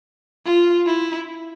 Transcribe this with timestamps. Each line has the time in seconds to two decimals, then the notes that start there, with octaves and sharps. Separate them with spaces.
0.46 F4
0.86 E4